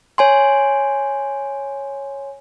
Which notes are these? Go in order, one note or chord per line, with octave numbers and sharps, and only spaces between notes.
C#5 G#5 C6